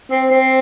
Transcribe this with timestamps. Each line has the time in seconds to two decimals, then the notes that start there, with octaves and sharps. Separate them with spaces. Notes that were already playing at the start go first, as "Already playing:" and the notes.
0.11 C4
0.31 C4